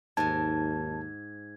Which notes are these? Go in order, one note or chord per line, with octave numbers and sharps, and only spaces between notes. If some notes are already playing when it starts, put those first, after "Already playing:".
D#2 G#2 G#5 A5 G#6